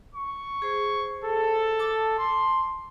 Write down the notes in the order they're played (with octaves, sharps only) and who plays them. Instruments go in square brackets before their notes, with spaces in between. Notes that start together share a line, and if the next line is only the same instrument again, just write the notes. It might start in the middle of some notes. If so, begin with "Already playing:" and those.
[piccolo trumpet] C#6
[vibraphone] G#4 C5
[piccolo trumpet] A4
[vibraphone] A5 D6
[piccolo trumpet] C6